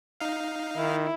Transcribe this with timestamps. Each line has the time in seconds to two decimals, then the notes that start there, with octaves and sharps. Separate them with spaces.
0.21 D#4 F5
0.77 D#3 E4